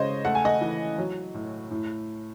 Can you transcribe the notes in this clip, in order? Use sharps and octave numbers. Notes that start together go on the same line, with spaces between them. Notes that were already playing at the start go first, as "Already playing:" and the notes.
Already playing: C#3 G#3 C5 C#5 D#5
A3 F#5
G#5
D#5 F#5
E3
F#3
A2
A2